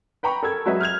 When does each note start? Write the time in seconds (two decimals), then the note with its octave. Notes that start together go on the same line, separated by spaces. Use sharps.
0.23 B4 G5 A#5 B5 C#6
0.43 A4 A#4 E6 G#6
0.66 F#3 G#3 F#4 B4 D#5 E5
0.81 F6 G6 G#6 F7